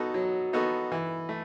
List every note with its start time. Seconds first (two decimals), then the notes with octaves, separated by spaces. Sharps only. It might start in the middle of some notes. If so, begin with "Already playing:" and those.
Already playing: F#3 B3 D#4 F#4 A4
0.14 F#3
0.53 B3 D#4 F#4 A4
0.92 E3
1.29 A3